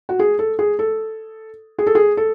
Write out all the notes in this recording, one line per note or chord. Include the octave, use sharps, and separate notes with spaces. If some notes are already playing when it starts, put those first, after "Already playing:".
F#4
G#4
A4
G#4
A4
G#4
A4
G#4
A4